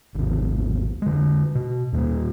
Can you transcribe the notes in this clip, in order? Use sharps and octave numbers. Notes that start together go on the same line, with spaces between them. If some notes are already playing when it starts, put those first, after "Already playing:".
G#1 D#2 B2
D3 G#3
B2
D#2 G3 G#3 A#3